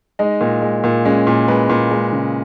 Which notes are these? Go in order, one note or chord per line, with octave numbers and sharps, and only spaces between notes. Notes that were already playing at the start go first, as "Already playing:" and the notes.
G#3 D#4
A#2
G#3
A#2
G#3 C#4
A#2
G#3 B4
A#2
G#3
C#3